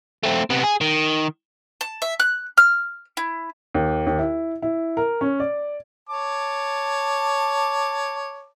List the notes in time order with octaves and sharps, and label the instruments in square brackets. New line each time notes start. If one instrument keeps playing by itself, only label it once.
[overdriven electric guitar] A3 C4
C3 B3
G#4
D#3
[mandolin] A5
E5
F#6
F6
E4
[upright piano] D#2
D#2
E4
E4
A#4
C#4
D5
[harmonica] C#5 A5 D6